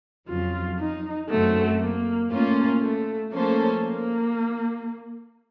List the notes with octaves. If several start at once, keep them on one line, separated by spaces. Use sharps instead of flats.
F2 C#3 F#3 F4
D#4
F#2 C#3 F#3 A3 C4 F#4
A#3
A#2 A3 A#3 C#4 F4
A3
F3 A3 A#3 C#4 A4 C5
A#3